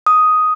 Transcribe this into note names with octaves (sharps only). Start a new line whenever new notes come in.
D#6